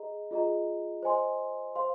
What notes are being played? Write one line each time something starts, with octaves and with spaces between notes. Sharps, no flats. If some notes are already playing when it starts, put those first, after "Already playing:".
Already playing: G#4 D#5 A#5
F4 G#4 D#5 A#5
C5 D#5 G#5 C6
C5 F5 C6